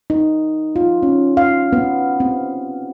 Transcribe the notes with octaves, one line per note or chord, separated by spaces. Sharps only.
D#4
F4
C#4
F5
B3
C4